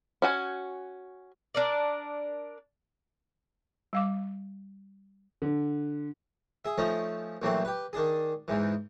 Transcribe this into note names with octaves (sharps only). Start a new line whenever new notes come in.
C#4 F#4 G#5
D4 A#4 D5
G3 F5 D6
D3
G#4 E5
F3 A3 C#4 D#4
A#1 E3 F#3 A3 C4
G4 B4
D#3 D4 G#4
E2 G#2 E3